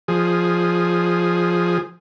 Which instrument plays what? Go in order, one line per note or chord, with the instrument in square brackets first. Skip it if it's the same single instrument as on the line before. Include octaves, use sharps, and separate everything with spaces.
[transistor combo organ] F3 G#4